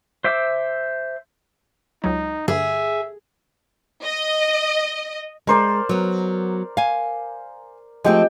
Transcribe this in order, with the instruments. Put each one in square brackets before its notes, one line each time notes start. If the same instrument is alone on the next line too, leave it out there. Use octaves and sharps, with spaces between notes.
[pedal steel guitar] C5 E5 D6 E6
[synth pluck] C#2 F#3 [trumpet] D#4
[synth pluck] G2 D3 [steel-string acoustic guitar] G#4 [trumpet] E5
[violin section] D#5
[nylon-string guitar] G#3 [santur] A#4 C5 D5
[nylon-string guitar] F#3 B3
F5 G#5
[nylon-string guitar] F3 A3 C4 [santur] G#3 G4 G5